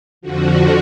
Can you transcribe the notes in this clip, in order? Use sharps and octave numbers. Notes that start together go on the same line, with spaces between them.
F2 D3 F3 F#4